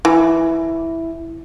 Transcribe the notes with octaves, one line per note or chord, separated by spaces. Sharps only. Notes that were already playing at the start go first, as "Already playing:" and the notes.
E3 E4